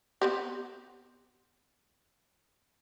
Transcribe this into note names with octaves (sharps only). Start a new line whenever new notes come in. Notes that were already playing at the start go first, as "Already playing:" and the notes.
B3 C4 G4